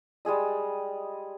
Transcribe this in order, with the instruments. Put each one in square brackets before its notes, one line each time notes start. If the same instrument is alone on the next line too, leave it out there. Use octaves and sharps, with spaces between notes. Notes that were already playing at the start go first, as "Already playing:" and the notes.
[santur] G3 G#3 G#4 D#5